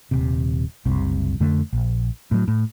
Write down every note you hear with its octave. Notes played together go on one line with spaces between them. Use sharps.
D#1 C3
F#1 C2 C3
F2 D3 A3
A#1
A2 F#3
A2